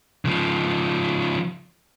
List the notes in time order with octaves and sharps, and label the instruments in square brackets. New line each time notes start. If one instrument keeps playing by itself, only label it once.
[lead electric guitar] C#3 F3